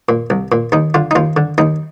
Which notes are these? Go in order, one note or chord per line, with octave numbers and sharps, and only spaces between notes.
A#2
C2
A#2
D#2 D#4
D3 F4
D#4
D#2 F4
D3
D#2 D#4